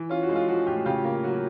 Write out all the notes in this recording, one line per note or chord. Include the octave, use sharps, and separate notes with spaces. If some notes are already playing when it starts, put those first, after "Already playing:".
Already playing: E3
C#4 F4
F#4
G#3
F4
F3 F#4
A2 F4 G4
C#3 F4 G4
A#3
F#3 F#4